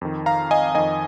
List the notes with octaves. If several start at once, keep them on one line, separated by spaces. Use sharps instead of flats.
F2 D#3
F5 A#5
D#5 G#5
F2 D#3 D#5 G#5